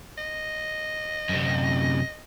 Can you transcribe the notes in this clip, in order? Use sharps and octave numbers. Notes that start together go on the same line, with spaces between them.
D#5
F#2 C3